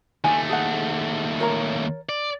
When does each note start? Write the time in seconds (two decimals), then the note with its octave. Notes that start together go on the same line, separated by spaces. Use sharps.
0.24 D#2 A3 G#5
0.49 G#4 A4 F#5
1.40 A#4 C#5 A#5
2.09 D5